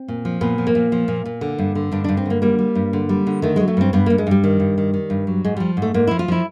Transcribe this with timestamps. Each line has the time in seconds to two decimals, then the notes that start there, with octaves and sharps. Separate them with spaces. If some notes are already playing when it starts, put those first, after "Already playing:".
Already playing: C4
0.08 A#2
0.25 F3
0.41 A#2 B3
0.58 F3
0.67 A#3
0.75 A#2
0.92 F3
1.08 A#2
1.25 A#2
1.41 D3
1.58 G2
1.75 D3
1.92 G2 D4
2.04 G2 D4
2.17 C4
2.26 D3 A#3
2.42 G3 A#3
2.59 G3
2.75 G2
2.93 D3
3.09 G3
3.27 D3
3.42 D#3 A3
3.56 F#3 G#3
3.68 A3
3.77 G2 C4
3.93 G2 B3
4.06 G2 A#3
4.18 G#3
4.27 G2 G3
4.44 D#3
4.60 G2
4.78 D#3
4.94 D#3
5.10 G2
5.27 F#3
5.44 G#2 G#3
5.57 F3 G3
5.77 G#2
5.82 A3
5.94 G#2 A#3
6.07 F3 E4
6.19 F4
6.28 F3 E4